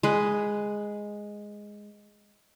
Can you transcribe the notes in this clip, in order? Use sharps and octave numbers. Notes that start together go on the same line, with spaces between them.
G#3 B4